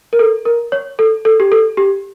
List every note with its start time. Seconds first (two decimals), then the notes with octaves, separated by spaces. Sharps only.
0.13 A#4
0.19 A4
0.45 A#4
0.72 C#5
0.99 A4
1.25 A4
1.40 G4
1.52 A4
1.77 G4